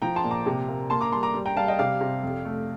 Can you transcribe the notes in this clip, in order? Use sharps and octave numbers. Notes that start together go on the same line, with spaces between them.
F3 G5 A#5
A5 C6
A#2
A#5 D6
C3
A#3
A#3 A5 C6
A#5 D6
G3 A5 C6
A#5 D6
G3
G5 A#5
G3 F5 A5
D#5 G5
C3 D5 F5
C3
F2
A3